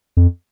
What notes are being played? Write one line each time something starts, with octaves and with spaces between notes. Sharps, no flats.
F2